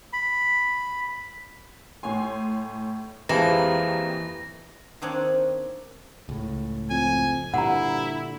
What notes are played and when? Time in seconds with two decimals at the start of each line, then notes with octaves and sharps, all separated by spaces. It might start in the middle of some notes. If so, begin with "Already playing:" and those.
0.13 B5
2.03 A2 C#5 G#5 C6
3.29 F2 E3 F3 G#3 A#3 G4 A#5 A#6
5.02 D#3 A#3 C4 D4 C#5 D#5
6.29 C#2 A2
6.90 F2 G#5
7.54 G2 A#2 D3 E4 F#5 A#5